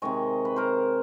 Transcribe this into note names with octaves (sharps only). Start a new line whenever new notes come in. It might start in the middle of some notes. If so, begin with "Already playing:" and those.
C3 D#3 G#3 C#5 D#5
B4
A#4 C5